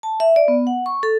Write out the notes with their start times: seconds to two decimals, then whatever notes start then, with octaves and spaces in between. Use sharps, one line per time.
0.03 A5
0.20 E5
0.36 D5
0.48 B3
0.67 F#5
0.86 C#6
1.03 A4